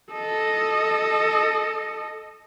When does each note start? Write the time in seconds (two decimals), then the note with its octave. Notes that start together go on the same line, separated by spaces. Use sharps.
0.12 A4 D#5